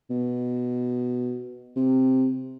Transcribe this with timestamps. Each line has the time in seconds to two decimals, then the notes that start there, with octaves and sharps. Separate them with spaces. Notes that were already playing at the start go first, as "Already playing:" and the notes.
0.10 B2
1.76 C3